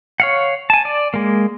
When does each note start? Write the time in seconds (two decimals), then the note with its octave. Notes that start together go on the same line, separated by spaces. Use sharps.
0.20 C#5 F5 F#5
0.70 G#5 A5
0.85 D5
1.14 G#3 A#3